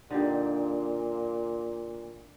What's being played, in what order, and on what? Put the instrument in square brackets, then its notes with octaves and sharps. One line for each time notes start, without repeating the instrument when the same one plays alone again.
[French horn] A#2 [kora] D3 D#4 G4